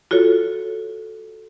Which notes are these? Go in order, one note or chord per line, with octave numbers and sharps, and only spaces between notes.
F4 F#4 A4 C#5